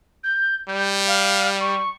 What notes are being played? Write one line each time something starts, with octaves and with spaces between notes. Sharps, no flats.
G6
G3 G6
F5
C#6